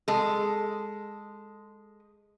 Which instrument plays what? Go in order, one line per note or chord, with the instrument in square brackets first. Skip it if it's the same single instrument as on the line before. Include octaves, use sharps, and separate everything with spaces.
[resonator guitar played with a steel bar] G#3 A4